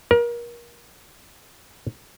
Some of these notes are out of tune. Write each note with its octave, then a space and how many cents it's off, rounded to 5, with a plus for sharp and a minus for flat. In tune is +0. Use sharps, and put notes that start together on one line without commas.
A#4 +30